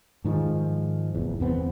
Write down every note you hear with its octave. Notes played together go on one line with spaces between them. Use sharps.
G#2 D#3 F3 G#3
F1 E2
G1 E2 B3 C4